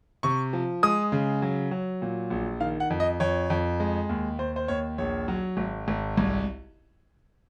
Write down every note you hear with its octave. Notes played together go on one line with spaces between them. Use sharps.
C3 C#6
F3
G#3 D#6
C#3
F#3
F#3
A#2
A#1
D#3 F5
F#5
F2
D#5
F2 C#5
F2
G#3
D#2
D#2 C5
C5
D#2 C#5
A#1 C#5
F#3
G#1
G#1
C2